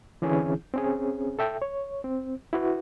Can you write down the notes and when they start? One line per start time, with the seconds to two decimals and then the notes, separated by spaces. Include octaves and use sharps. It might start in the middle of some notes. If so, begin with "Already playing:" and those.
0.22 D3 E3 C4 C#4 E4 G#4
0.74 C4 C#4 G#4
1.39 A4 E5 G5
1.62 C#5
2.04 C4
2.53 E4 F#4 B4